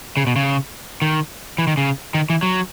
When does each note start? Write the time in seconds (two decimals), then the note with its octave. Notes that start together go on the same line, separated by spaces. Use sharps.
0.17 C#3
0.27 B2
0.36 C#3
1.02 D#3
1.58 E3
1.67 D#3
1.77 C#3
2.14 D#3
2.30 E3
2.43 F#3